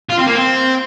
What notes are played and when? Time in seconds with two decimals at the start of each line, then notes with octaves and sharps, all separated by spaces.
0.10 F4
0.19 C4
0.27 A#3
0.35 C4